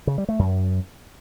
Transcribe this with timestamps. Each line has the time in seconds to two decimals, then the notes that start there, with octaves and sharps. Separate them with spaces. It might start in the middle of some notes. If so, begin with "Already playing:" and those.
0.07 C#3
0.18 G3
0.29 A3
0.39 F#2